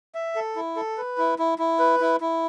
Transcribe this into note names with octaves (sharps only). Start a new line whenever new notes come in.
E5
A4
E4
A4
B4
E4
E4
E4
B4
E4
E4